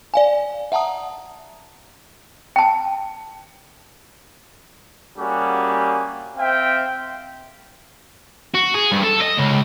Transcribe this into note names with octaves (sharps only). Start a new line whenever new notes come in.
D5 F5 G#5
E5 F#5 A5 A#5 D#6
G5 A5
G3 A#3 C#4 F#4 G#4
C4 E5 F5 G5
F#4
G#4
G2
A4
D#5
C#2